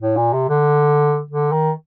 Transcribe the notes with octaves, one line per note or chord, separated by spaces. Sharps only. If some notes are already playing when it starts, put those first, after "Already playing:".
A2
A#2
C3
D3
D3
D#3